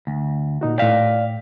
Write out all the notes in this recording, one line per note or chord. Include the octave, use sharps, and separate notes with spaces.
D2
A#2 D#4 F#4
A2 D5 F5 G5